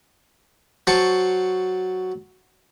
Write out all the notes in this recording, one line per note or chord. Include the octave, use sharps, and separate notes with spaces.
F#3 C5 A5 C#6